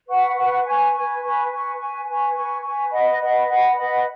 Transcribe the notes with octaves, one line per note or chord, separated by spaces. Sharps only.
B4 F#5 C#6
B4 F#5 C#6
B4 G#5 C#6
B4 G#5 C#6
B4 G#5 C#6
B4 G#5 C#6
B4 G#5 C#6
B4 G#5 C#6
B4 G#5 C#6
B4 G#5 C#6
B4 D#5 F#5 B5
B4 D#5 F#5 B5
B4 D#5 F#5 B5
B4 D#5 F#5 B5